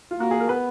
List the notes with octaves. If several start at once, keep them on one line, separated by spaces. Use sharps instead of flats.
F4
A#3 F#4
G#4
A#4
B3 B4